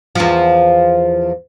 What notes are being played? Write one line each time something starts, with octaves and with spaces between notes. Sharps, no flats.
E2 F3